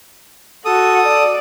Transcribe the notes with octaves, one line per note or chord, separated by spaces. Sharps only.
F#4 A4 D#6
D5